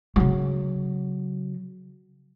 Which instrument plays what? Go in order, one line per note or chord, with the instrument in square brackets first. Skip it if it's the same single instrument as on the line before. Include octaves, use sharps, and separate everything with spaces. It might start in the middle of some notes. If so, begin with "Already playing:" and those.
[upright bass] C#3 F#3